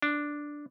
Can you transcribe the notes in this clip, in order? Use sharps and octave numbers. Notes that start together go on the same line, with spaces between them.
D4